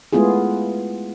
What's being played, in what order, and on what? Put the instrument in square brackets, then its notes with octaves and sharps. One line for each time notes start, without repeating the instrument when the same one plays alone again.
[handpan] G#3 A3 B3 E4 F4 G#4